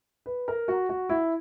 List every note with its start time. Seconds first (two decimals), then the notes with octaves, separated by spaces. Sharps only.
0.26 B4
0.48 A#4
0.68 F#4
0.89 F#4
1.09 E4